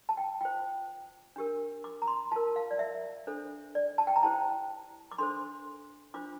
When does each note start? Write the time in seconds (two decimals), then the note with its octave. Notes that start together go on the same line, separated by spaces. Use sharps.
0.09 A5
0.17 G5
0.41 F4 C5 G5
1.36 D4 G4 A#4
1.84 D6
2.02 A#5
2.07 C6
2.32 F4 A#4 A5
2.56 F5
2.71 D5
2.79 E5
3.27 D4 A4 C5
3.75 D5
3.98 A5
4.07 G5
4.16 A#5
4.23 E4 G4 C5 A5
5.12 D6
5.18 D4 A4 C5 C6
6.14 D4 F4 C5 D6